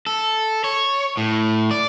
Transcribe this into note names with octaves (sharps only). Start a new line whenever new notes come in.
A4
C#5
A2
D5